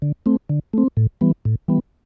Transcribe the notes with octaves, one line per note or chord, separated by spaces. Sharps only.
D3
A3 C4
D3
A3 C4
A2
E3 G3 B3
A2
E3 G3 B3